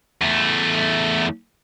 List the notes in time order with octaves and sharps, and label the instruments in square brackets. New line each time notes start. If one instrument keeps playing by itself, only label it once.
[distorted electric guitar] E2 A3